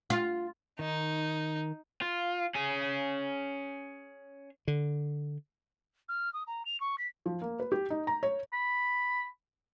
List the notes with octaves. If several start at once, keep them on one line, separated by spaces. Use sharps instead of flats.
F4
D#3 D#4
F4
C#4 G#4
D3
F6
D#6
A#5
F7
C#6
B6
F3
A#3
B4
G4
D#4
A#5
C#5
B5